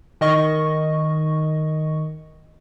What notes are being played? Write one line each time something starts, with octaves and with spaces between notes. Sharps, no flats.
D#3 D#5 C#6